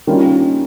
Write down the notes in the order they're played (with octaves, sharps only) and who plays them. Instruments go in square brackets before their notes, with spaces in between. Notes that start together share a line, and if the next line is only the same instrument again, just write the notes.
[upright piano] D#3 G3 A#3 C#4 F4